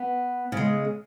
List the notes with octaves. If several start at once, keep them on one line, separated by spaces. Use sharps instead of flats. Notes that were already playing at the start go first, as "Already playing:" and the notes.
Already playing: B3
C#3 G#3